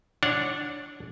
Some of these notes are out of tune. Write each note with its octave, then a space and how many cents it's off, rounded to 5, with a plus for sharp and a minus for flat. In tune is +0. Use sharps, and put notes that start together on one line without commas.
D4 -5 C#5 +0 F#5 -20